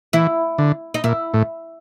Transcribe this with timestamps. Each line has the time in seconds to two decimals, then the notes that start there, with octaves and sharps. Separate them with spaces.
0.13 E3 E4
0.58 D3
0.94 D#4
1.04 A#2 E4
1.34 A2